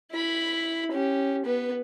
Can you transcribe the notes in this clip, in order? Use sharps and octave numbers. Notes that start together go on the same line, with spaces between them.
E4 B5
C#4 G4
B3 B4